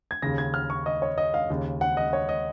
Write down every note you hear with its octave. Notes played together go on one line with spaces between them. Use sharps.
G#6
D#2 C#3 A#6
G#6
F6
C#6
D#5
C#5
D#5
F5
D#2 C#3
F#5
D#5
C#5
D#5